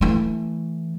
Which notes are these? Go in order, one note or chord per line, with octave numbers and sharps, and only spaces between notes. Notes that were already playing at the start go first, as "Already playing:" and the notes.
E3 A3